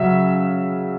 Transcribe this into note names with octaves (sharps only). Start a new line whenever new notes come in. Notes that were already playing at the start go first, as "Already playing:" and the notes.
Already playing: C#3 F#3 E5